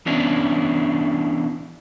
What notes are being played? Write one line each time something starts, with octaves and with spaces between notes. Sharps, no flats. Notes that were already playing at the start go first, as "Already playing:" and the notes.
E3 B3 C#4 D4 E4